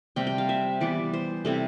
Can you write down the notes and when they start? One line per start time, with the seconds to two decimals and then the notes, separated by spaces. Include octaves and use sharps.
0.16 C3 G3 C4 G5
0.27 G5
0.38 F5
0.49 E5
0.81 E3 G3 B3 D5
1.14 C5
1.45 C3 G3 C4 E4 A4